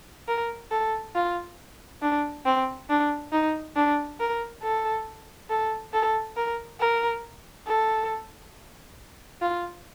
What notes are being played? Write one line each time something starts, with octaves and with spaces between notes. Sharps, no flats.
A#4
A4
F4
D4
C4
D4
D#4
D4
A#4
A4
A4
A4
A#4
A#4
A4
F4